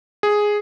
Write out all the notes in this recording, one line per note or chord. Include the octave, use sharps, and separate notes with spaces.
G#4